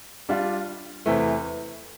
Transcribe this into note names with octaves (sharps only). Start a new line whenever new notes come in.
G3 D4 F4
E2 C3 E3 A3